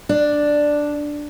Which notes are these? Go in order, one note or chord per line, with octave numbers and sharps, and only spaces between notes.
D4